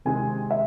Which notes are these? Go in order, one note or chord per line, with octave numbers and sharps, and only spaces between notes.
C3 D#3 G#3 C4 G#5
E5